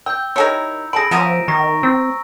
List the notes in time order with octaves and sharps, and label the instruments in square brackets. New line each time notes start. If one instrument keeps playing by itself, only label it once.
[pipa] G5 [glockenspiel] E6 G6
[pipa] D#3 G4 C#5 [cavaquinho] E4 A4 A#4 [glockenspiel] E6 C#7
[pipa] G#4 A4 B5 [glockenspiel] A#6 D7
[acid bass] F3 [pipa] B3 C#4 [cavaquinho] A#4 E5 D#6
[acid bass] D#3 [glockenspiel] A#5 C#6 A#6
[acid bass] C4 [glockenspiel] E6